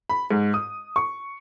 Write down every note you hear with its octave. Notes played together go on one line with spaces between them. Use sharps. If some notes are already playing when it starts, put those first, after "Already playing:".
B5
G#2
D#6
C#6